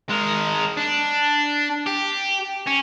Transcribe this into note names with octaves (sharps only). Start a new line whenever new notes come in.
G#3 A#4
D4
G4
C#4